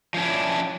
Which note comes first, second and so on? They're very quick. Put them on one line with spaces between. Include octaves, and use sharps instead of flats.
F3 C#4 D4 E4